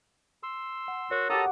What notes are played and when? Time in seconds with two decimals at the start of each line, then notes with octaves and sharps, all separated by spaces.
0.43 C6 E6
0.88 F#5
1.11 F#4 A#4 C#5
1.29 F#4 G4 A4 A5 A#5 D6 D#6